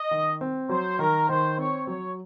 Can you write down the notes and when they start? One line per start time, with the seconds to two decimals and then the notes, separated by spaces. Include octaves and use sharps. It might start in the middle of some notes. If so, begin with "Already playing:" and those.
Already playing: D#5
0.11 D#3
0.41 C4
0.69 F#3 C5
0.99 D#3 A#4
1.29 D#3 C5
1.58 C4 C#5
1.87 F#3 C#5